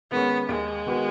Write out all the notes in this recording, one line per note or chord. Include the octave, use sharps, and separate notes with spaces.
D#3 G#3 B3 C#4
D#2 G#3
D#3 B3 F#4 B4